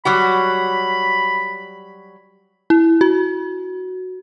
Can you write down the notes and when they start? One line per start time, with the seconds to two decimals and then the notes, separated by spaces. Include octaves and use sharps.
0.05 F#3 G3 F#4 B5
2.70 E4
3.01 F#4